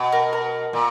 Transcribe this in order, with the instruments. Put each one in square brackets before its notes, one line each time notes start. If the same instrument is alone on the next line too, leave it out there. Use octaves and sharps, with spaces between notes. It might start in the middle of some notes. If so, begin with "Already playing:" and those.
Already playing: [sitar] B2
[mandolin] A#4
A#4
[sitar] A#2